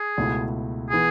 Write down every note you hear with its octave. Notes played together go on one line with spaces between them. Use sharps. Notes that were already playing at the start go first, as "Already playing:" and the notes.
Already playing: G#4
C#2 B2 A3 E4
E3 B3 G#4